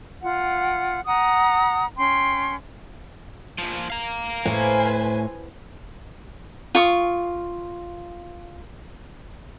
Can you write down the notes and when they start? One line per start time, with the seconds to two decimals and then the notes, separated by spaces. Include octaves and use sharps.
0.22 F4 F#5
1.07 F#5 A#5 D#6
1.97 C#4 G5 C6
3.58 A#2 F3
3.90 F5 A#5
4.46 A2 B4 C5 G#5
6.75 F4 C#6 D#6